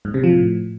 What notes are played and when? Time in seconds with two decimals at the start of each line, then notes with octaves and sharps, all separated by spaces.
0.05 G#2
0.14 C3
0.24 F3
0.33 A2